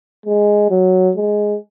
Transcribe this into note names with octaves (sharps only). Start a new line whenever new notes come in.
G#3
F#3
G#3